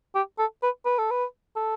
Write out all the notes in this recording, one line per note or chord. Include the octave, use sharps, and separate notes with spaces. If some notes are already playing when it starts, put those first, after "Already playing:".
G4
A4
B4
B4
A4
B4
A4